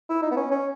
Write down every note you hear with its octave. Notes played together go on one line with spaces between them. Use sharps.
E4
D#4
B3
C#4
C#4